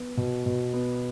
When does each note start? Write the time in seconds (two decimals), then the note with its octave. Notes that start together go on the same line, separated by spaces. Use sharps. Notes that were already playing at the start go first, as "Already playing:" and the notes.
Already playing: B3
0.17 B2
0.46 B2
0.73 B3